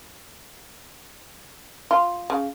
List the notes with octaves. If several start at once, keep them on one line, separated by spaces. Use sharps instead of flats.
F4
C#3